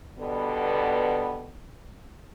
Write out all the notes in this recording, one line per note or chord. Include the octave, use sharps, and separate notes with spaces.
B2 D3 G3 B3